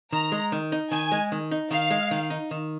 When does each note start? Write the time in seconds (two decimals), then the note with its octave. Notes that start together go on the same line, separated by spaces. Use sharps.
0.13 D#3 A#5
0.32 G#3
0.52 D#3
0.72 D#4
0.91 D#3 G#5
1.12 G#3
1.32 D#3
1.51 D#4
1.71 D#3 F5
1.91 G#3
2.11 D#3
2.30 D#4
2.51 D#3